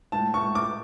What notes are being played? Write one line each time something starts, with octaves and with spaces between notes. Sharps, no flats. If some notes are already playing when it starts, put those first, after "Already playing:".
A2 A5
C#6
A2
D6